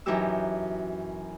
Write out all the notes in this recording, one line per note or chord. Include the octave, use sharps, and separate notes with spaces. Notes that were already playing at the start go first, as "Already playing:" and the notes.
F#2 E3 D#4 F#4 G4 E6